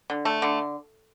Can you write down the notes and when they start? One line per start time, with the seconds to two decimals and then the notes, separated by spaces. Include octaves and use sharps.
0.10 D3
0.25 A3
0.42 D3